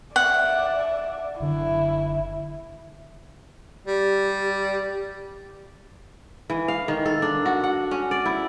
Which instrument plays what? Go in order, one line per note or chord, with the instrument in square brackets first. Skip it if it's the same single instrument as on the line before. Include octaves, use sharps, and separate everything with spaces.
[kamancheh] D5 E5 [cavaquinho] F#5
[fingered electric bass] F#1 D3 [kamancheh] E4
[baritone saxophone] G3 [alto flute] G4
[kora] E3
F5
D#3
A4
D4
F#4
F#5
C#4
D5
E4